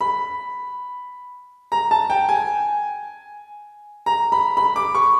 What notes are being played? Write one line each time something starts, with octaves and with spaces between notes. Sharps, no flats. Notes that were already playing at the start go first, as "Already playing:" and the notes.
B5
A#5
A5
G5
G#5
A#5
B5
B5
D6
C#6